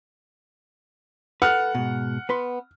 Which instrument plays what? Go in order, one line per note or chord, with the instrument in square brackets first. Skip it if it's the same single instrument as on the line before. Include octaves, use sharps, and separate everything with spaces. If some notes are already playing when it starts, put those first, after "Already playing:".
[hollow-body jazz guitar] A4 B4 [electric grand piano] F#5 [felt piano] F6
[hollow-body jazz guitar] G#2 B2
B3 B4 C6